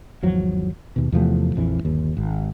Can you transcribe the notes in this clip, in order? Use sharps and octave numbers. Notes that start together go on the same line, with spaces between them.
G#1 E2 F3 F#3
D#2 B2
E2 C3 F3 A3
A#1 F2 E3
G1 D#2
G#1